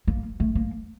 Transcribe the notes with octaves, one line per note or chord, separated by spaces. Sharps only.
A#3
A3
A#3